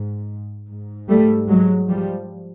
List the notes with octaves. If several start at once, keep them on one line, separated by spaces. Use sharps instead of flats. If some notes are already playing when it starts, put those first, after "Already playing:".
Already playing: G#2
G#2
G3 A3
F#3 G#3
F3 G3